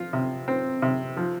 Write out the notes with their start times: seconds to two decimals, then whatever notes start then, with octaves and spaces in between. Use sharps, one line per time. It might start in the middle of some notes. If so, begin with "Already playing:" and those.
Already playing: F3 F4
0.13 C3
0.48 C4
0.82 C3
1.17 F3